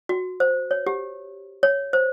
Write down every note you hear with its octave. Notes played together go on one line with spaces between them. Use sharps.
F#4
C5
C#5
G4
C#5
C5